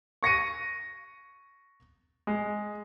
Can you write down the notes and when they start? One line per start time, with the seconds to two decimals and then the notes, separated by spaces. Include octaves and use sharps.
0.23 C#6 A#6 C#7 D#7
2.27 G#3